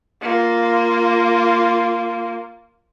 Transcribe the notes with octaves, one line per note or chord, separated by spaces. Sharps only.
A#3 F4